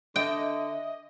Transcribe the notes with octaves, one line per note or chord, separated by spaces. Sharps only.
D3 D#5 E5 G5